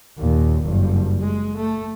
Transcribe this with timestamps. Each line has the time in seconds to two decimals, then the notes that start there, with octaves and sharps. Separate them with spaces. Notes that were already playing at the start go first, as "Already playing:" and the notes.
0.18 D#2 A#2
0.63 F#1 G2
1.21 G#3
1.56 A3